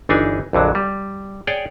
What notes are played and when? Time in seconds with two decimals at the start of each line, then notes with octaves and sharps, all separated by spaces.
0.09 G1 E3 D4 D#4 G#4 G#5
0.53 A#1 F2 D3 F#3
0.75 G3
1.47 G#4 C#5 D5 G5